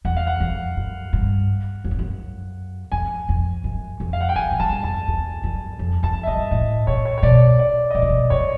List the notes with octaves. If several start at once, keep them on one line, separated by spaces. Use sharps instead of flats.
E2 F#5
F5
F#5
F2
F#2
G2
F#2
G2
F#2
F2 G#5
F2
F#2
F2
F5
F#5
G5
F2 G#5
G#2
G2 A5
F2 A5
E2
F#2
F2
F2 A5
E5
G2 D#5
A2 D#5
A#2 C#5
C#5
C#5
B2 D5
D5
D#5
B2 D5
C3
B2
F#2 C#5